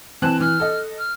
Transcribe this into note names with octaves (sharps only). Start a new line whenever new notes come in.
E3 C4 A5 F#6
E3 F6
A4 D#5
F6